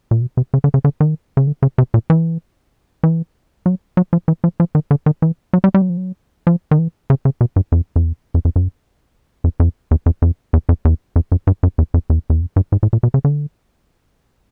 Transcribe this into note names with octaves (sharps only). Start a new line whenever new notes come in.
A#2
B2
C3
C#3
D3
C#3
D3
D#3
C#3
D3
C#3
C3
A#2
E3
E3
F#3
F#3
F3
E3
F3
F3
D#3
D3
D#3
E3
F#3
G3
G3
F#3
F3
F#3
F3
D#3
E3
C#3
C#3
B2
G2
F2
F2
E2
F2
F2
F#2
F2
F2
E2
F2
F2
E2
F2
E2
F2
F#2
G2
F#2
E2
F2
E2
E2
F2
G2
G#2
A2
A#2
B2
C#3
D3